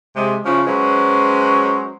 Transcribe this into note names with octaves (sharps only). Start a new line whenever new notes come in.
C3 G#3
C#3 F3 C#4 E4 F4
F#3 G#3 C#4 B4 C5